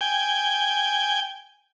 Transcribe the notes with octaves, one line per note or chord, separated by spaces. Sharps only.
G5 G#5